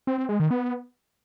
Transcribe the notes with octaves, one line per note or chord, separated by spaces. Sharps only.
C4
C4
G#3
D#3
B3